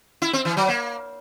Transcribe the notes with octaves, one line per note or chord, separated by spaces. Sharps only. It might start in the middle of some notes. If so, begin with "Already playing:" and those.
E4
C4
E3
F#3
A#3